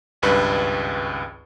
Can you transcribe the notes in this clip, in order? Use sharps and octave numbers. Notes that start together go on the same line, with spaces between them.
G#1 C#2 G2 B4